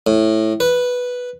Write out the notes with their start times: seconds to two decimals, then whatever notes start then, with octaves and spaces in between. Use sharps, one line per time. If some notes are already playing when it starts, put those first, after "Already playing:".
0.07 A2
0.60 B4